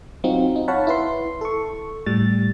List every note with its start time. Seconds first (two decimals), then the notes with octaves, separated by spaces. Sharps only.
0.24 F#3 C4 D#4 F4 F#4
0.56 D#4
0.68 C#5 F5 F#5 A5 B5
0.87 E4 B4 C6
1.41 A4 C#6
2.06 A2 G3 A6